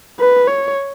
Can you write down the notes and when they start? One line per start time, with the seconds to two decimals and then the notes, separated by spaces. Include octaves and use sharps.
0.20 B4
0.48 C#5